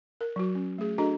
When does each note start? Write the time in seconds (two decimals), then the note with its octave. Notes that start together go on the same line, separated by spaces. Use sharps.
0.21 A#4
0.36 F#3 F#4
0.55 C#4
0.78 A3 G#4
0.98 D4 F#4 A4 D#5 A#5